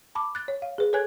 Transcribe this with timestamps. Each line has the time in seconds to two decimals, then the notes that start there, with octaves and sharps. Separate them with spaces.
0.15 A5 B5 D6
0.35 F#6 A6
0.48 C#5
0.62 F5
0.78 G#4 B4
0.93 A4 B4 C#5 G#5 F#6 G#6